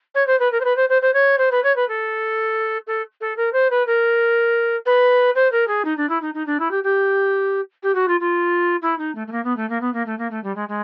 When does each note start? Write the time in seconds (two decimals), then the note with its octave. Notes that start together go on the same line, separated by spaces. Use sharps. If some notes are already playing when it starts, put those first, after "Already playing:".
0.15 C#5
0.27 C5
0.39 B4
0.52 A#4
0.60 C5
0.64 B4
0.76 C5
0.89 C5
1.02 C5
1.13 C#5
1.38 C5
1.51 B4
1.63 C#5
1.76 B4
1.88 A4
2.87 A4
3.21 A4
3.37 A#4
3.53 C5
3.70 B4
3.86 A#4
4.86 B4
5.35 C5
5.52 A#4
5.67 G#4
5.85 D#4
5.97 D4
6.09 E4
6.22 D#4
6.34 D#4
6.46 D4
6.59 E4
6.71 G4
6.83 G4
7.83 G4
7.95 F#4
8.08 F4
8.20 F4
8.82 E4
8.98 D#4
9.15 A3
9.27 A3
9.32 A#3
9.44 B3
9.56 A3
9.69 A#3
9.81 B3
9.93 A#3
10.06 A3
10.18 A#3
10.31 A3
10.43 G3
10.55 G#3
10.68 G#3